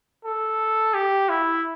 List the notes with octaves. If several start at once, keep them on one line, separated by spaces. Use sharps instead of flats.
A4
G4
E4